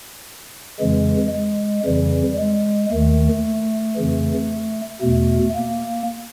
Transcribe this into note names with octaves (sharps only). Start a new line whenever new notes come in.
F2 C#3 E3 G#3
G#3
F2 C#3 E3 G3
G#3
D#2 D#3 A3
F2 C#3 E3
E2 B2 A3
A#3